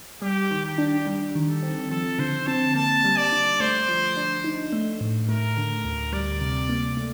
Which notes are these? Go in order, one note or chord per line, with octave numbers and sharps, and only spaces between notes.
G3 G4
D#3
G4
D4
G3
D#3
A4
C4
F3 A4
D3 C5
C4 A5
A#3 A5
G3
D5
D3
A3 C5
F3
D4
D#4
A3
A2
A3 A#4
D3
D2
G3 D5
C3
A#3
A3